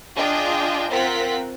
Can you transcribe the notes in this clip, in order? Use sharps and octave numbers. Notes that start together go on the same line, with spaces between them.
D4 F4 G#4 D#5 G5
C4 F4 A#4 F#5 B6